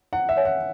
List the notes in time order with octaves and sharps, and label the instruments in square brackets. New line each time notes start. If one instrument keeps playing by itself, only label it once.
[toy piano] E4 [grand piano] F#5
[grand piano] E5
[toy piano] C#5 G#5
[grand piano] F#5